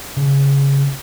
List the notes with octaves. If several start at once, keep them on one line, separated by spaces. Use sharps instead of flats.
C#3